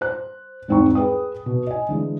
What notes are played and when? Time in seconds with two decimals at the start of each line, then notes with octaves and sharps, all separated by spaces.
0.01 C5 F#6
0.68 E2 G#2 C4 D#4 C#6
0.95 G#4 B4 G5 D#6
1.46 B2
1.67 D#5 G#5
1.89 D3 E3 G#3